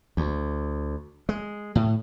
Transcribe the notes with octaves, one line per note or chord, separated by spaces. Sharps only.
D2
G#3
A2